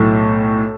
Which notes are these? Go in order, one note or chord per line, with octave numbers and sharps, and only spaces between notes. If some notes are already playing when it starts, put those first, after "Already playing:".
Already playing: B1 A2 A3 E4 A4